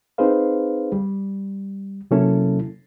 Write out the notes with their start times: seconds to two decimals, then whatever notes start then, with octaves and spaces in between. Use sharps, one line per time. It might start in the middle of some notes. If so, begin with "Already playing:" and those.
0.18 C4 D#4 G#4 B4 C5 F5
0.92 G3
2.11 C3 F#3 A#3 C#4 E4 A4